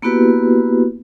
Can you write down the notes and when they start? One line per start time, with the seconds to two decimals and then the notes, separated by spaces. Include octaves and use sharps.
0.02 A#3 B3 E4 F#4 G4 B4